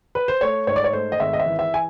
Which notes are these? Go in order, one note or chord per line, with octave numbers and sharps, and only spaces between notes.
B4
C5
A3 C#5
G#2 C#5
D5
C#5
A3 C5
D#5
G#1 E5
D#5
E5
E3
E5
G#5